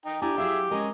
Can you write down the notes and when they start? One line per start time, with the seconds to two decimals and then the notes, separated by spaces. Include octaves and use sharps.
0.06 D#4 G5
0.22 D4 E4 G4 G#5 A#5
0.38 F#3 G#4 E5 F5 E6
0.71 G#3 C#4 A#4 D#5 G#5